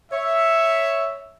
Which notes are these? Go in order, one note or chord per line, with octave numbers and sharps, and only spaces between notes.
C#5 E5